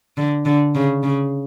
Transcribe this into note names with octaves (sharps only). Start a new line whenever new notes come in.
D3
D3
C#3
C#3